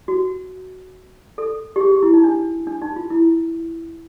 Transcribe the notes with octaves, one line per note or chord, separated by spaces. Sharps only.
F#4
A4
G4
G#4
G4
E4
D#4
D4
D4
D#4
F4
E4